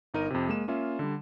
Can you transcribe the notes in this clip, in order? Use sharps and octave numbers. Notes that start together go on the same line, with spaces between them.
G1 D#4 A#4 D#7
F2 C3
G#3 A#3 E7
A#3 C#4 F4 E5 F5
D3 G3